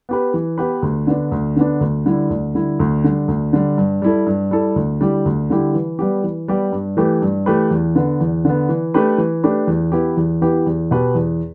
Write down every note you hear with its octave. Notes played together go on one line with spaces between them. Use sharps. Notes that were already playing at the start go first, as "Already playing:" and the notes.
B3 G4 B4
E3
B3 G4 B4
D2
D3 B3 D4
D2
D3 B3 D4
D2
D3 G3 E4
D2
D3 G3 E4
D2
D3 G3
D2
D3 G3
G2
G3 E4 A4
G2
G3 E4 A4
D2
D3 G3 E4 G4
D2
D3 G3 E4 G4
E3
G3 B3 G4
E3
G3 B3 G4
G2
E3 A3 G4 B4
G2
E3 A3 G4 B4
E2
D3 B3
E2
D3 B3
E3
A3 D4 G4 B4
E3
A3 D4 G4 B4
E2
E3 B3 E4 G4
E2
E3 B3 E4 G4
E2
B2 B3 G4 B4
E2